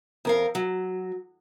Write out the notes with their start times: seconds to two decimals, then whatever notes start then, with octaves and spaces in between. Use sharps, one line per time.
0.25 F2 A#4 F5
0.55 F#3